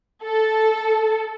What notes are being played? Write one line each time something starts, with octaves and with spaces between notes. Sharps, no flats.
A4